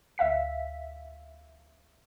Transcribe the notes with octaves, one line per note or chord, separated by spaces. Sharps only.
D2 E5 F5 B6